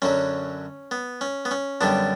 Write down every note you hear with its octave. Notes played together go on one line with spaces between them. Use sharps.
F#2 D3 F#3 C#4
B3
C#4
B3
C#4
F#2 D3 G3 B3 D4